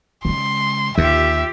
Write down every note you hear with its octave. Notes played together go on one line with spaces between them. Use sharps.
C#3 G#3 C6
D#2 D3 F4 G4 E5